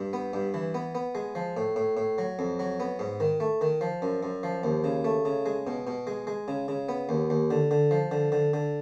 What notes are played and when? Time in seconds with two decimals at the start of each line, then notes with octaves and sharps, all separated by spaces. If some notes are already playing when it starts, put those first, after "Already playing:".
Already playing: G2
0.13 B3
0.33 G2
0.54 E3
0.74 B3
0.95 B3
1.15 G#3
1.35 F3
1.57 A2
1.76 A2
1.97 A2
2.18 F#3
2.39 F2
2.59 F#3
2.80 B3
2.99 G#2
3.20 D#3
3.40 A3
3.61 D#3
3.81 F3
4.02 F#2
4.23 F#2
4.43 F3
4.64 D#2
4.84 C#3
5.05 A3
5.25 C#3
5.46 G#3
5.67 B2
5.87 B2
6.07 G#3
6.27 G#3
6.48 C#3
6.68 C#3
6.89 B3
7.09 D#2
7.30 D#2
7.50 D3
7.71 D3
7.91 F3
8.11 D3
8.32 D3
8.54 D3